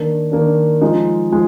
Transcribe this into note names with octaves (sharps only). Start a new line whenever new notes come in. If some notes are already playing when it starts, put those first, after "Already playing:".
Already playing: D#3 A#3 D4
D#3 A#3 D4
F3 G#3 D#4
F3 G#3